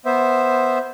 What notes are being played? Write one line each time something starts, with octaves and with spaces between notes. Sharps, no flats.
B3 C5 E5